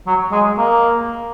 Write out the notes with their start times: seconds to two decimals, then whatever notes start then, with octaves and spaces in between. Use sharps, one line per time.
0.07 F#3
0.32 G#3
0.58 A#3